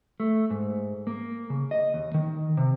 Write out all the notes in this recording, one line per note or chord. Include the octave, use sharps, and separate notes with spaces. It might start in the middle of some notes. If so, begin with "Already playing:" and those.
A3
G#2
A#3
C#3
D#5
D#2
D#3
C3